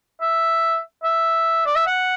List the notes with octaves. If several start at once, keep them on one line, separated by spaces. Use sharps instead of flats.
E5
E5
D5
E5
F#5